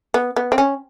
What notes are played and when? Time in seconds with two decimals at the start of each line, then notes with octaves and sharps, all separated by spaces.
0.14 B3
0.36 B3
0.52 C4
0.58 C#4